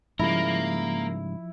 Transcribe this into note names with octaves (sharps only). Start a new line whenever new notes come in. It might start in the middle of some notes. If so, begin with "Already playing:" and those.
G#2 C#3 F3 G3 A#3 E4 A#4